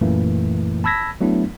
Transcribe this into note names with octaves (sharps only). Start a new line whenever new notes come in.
F#2 A#2 E3 A3 A#3
A5 B5 E6 G#6 A#6 B6
F#3 A3 B3 D4 E4